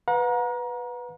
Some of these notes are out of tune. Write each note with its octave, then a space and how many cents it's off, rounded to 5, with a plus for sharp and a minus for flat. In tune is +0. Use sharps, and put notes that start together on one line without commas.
B4 +0 F#5 -40 A#5 +25